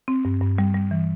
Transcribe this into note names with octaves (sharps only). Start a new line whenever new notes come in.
C4
G2
G2
G3
G3
E3